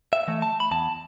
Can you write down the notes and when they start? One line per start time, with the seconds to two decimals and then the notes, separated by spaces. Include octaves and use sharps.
0.13 E5
0.28 E3 A3
0.42 A5
0.60 B5
0.71 E2 A5